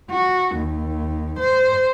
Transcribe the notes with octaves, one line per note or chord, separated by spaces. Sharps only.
F#4
D#2
C5